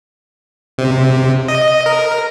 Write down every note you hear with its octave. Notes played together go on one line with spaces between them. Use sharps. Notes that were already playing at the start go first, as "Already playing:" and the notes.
C3
D#5
A#4